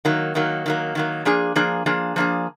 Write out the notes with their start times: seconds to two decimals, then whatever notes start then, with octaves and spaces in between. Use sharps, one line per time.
0.05 D#3 F#3 A#3
0.35 D#3 F#3 A#3
0.66 D#3 F#3 A#3
0.95 D#3 F#3 A#3
1.25 F3 A#3 D4 G#4
1.56 F3 A#3 D4 G#4
1.86 F3 A#3 D4 G#4
2.16 F3 A#3 D4 G#4